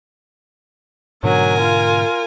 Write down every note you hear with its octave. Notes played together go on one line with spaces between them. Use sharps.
G#2 B2 D3 F#3 A#4 G#5
F4